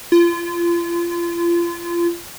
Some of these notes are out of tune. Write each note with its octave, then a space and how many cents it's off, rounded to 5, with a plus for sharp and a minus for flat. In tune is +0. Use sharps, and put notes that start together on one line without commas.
F4 -30